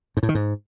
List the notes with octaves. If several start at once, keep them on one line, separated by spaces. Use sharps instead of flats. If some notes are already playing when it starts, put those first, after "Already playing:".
G#2
A2
D#3
G#2